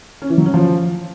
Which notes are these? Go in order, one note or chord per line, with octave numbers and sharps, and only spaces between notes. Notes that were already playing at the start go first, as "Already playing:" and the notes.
C#4
E3
F#3
C#4
F3